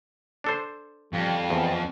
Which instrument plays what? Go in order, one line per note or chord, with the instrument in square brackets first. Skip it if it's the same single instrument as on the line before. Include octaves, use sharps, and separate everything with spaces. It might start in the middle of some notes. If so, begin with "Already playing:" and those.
[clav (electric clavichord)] D4 A4 C5
[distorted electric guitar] F2 [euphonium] G3
[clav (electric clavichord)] E2 [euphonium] C4